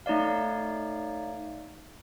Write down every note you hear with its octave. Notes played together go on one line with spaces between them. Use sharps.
A3 D#4 C#5 D5 F5